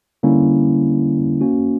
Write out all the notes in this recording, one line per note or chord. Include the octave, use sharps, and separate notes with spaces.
D3 G3 A#3 C#4 E4
A#3 C#4 F#4